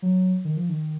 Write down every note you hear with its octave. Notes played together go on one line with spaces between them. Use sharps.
F#3
D#3
F3
D#3